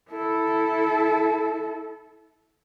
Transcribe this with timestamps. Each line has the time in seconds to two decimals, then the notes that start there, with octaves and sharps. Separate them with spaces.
0.10 E4 A4